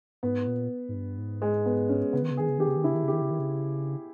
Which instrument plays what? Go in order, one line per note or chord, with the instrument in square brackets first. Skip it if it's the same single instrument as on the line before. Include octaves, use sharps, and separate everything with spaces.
[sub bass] G#2 [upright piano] B3
[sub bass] A#2
G#2
G2
G#2
[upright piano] G#3
B3
C#4
[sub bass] C#3 [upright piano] B3
[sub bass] D#3
C#3
[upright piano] G#4
[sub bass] D#3
C#3
[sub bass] D#3 [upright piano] G4
[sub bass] C#3
D#3
[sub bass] C#3 [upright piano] E4
[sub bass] D#3
C#3
[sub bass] D#3 [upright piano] G4
[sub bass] C#3
D#3
C#3